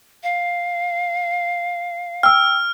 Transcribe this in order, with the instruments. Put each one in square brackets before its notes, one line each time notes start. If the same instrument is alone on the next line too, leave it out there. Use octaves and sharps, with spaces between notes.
[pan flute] F5
[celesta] G5 E6 [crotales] F6